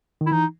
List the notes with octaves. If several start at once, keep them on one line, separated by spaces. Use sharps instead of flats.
D#3
E4
E3 D#4